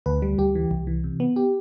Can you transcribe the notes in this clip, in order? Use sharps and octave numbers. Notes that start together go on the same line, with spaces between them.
D2 B4
G3
D2 G4
E3
C2
E3
C3
B3
G4